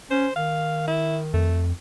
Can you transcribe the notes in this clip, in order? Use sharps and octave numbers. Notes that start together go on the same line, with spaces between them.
C#4 C5
D#3 F5
E4
F2 A3